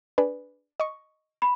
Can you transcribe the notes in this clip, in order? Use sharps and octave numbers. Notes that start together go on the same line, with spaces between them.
D4 G#4 B4
D#5 C#6
B5